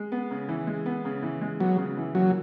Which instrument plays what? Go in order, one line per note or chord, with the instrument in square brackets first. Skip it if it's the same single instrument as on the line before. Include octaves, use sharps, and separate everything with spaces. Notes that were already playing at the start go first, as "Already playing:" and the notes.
Already playing: [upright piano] G#3
B3
C#3
E3
G#3
B3
C#3
E3
G#3
[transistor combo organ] F#3 [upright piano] B3
[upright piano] C#3
E3
[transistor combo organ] F#3 [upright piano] A#3